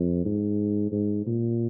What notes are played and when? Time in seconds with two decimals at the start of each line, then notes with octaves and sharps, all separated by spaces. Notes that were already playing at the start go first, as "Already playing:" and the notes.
Already playing: F2
0.25 G#2
0.92 G#2
1.27 A#2